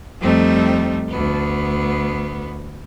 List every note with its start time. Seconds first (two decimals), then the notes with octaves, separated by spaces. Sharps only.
0.20 F2 G3 A3 C4 D#4
1.08 D2 B3